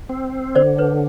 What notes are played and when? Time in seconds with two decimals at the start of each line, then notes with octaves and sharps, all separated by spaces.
0.09 C4
0.55 D3 C5 D5
0.78 B4 C#5